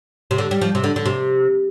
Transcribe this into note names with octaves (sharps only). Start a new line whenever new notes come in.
C3
D3
G3
F3
C3
D3
D3
C3